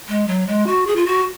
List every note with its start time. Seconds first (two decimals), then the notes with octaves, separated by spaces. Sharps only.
0.08 G#3
0.27 F#3
0.47 G#3
0.67 F#4
0.87 G#4
0.96 F4
1.06 F#4